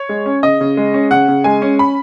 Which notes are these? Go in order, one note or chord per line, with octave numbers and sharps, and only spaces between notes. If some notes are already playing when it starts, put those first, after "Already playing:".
Already playing: C#5
G#3
C#4
C#3 D#5
C#3
G#3
C#4
C#3 F#5
C#3
G#3 G#5
C#4
B5